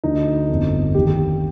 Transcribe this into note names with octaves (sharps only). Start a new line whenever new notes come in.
D2 D3 D#4
G1 F2 D3
D#2 D#3 G4